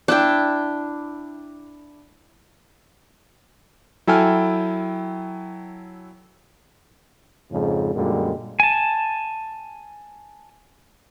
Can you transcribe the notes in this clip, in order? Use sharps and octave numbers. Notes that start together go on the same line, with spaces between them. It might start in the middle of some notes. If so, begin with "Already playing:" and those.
D4 E4 G5
F#3 E4 A4 G5 G#5 F6
F2 G#2 C#3
F#2 A#2 D3 G3 G#3
G#5 A5